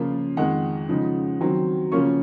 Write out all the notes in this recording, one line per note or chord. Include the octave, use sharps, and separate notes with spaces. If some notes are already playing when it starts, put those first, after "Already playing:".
Already playing: C#3 F3 A#3 F4
F2 D#3 G#3 F#5
C#3 F3 G#3 D#4
D#3 F#3 C4
C#3 F3 A#3 C#4 F4 C#6